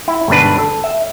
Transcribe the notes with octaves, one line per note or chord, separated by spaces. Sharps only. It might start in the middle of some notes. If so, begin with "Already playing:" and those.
E4
G1 G#2 B2 D4 B4
A4
E5